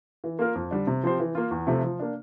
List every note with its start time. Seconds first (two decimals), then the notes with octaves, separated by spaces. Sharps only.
0.24 E3
0.39 A#3 F4 A#4
0.55 F2
0.71 D3 G3 D4
0.87 C3
1.03 F3 C4 G4 C5
1.20 E3
1.35 A#3 F4
1.51 E2
1.67 C3 F3 A3
1.84 F3
1.99 A#3 D4